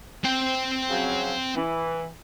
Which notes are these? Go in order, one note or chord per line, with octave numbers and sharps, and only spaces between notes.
C4 G5
C#3 F3 F#3
E3